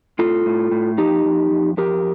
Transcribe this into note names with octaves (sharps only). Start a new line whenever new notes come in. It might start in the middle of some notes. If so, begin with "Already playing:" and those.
A2 F4 A4
A2
A2
F2 D#4 G4
F2
F2
F2 G4 A#4